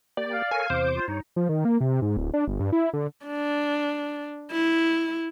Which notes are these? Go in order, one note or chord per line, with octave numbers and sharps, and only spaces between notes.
A#3 G4 D5
F5
A4 A#4 C#5 G#5
E2 C3 C5 D6
F4
G2 D#4 C#5
F3
D#3
A#3
C3
G#2
D1
D4
G1
G2
E4
D3
D4
E4